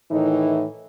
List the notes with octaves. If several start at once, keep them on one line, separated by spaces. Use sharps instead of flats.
A2 D#3 E3 D#4